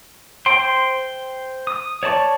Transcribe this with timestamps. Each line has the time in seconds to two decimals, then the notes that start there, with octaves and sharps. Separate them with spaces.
0.46 C5 G5 C6
1.67 D#6
2.03 C#5 D5 A5 C#6